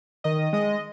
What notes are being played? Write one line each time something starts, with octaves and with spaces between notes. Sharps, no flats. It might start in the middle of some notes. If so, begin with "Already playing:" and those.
D#3 D#5
G#3 D#5